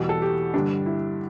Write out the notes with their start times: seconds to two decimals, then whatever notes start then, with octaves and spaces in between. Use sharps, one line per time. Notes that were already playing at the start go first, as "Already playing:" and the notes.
Already playing: E2 B2 G3
0.09 A4
0.22 G4
0.54 G2 D3 G3 D4
0.86 E4